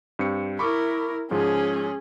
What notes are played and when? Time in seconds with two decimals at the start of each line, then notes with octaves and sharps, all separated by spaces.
0.19 G2 C4 C#7
0.59 E4 A#4 B5 C#6 D6
1.31 G#2 F3 G#3 C#4 G#4